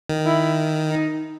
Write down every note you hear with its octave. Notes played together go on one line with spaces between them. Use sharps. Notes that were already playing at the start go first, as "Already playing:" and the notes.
D#3
E4
D#4